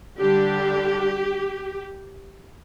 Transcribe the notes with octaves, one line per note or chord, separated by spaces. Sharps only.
D3 G3 D4 G4